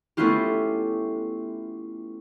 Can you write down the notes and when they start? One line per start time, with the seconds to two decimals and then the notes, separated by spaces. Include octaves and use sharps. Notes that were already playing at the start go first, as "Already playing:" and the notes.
0.17 A3 B3 C#4 E4 F4 G4